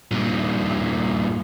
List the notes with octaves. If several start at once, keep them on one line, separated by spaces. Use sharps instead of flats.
G2 A#2